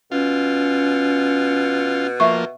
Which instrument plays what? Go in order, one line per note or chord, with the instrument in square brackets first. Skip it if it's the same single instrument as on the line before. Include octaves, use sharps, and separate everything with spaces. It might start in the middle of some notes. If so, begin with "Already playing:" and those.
[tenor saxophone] B2 [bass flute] C#4 [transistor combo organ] F4
[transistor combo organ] F3 A#3 [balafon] E5 C#6